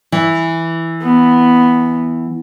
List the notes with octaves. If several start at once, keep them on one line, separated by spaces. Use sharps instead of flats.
E3
B3